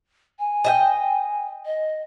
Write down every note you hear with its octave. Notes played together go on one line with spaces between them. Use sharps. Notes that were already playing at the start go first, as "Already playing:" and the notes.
G#5
D#5 E5 G5
D#5